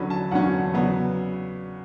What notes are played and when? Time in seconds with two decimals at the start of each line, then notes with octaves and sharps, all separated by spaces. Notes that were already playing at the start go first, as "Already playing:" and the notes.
Already playing: E2 D3 F#3 C#4 B5
0.10 A5
0.31 E2 D3 F#3 C#4 F#5
0.73 C#3 F#3 B3 D4